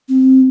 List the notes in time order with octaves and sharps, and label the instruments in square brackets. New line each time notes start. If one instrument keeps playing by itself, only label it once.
[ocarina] C4